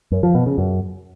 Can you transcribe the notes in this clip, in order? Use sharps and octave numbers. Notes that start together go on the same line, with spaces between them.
F#2
F3
B2
C#3
F#2